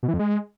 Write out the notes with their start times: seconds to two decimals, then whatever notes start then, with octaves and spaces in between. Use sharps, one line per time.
0.03 B2
0.08 E3
0.14 F2
0.19 G#3